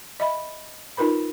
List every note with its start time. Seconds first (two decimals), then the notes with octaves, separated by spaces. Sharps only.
0.20 D#5 E5 B5
0.97 D#4 F4 A#4 B4 B5